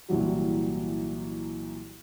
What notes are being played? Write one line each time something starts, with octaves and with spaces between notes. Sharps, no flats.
C2 A#2 E3 F#3 G3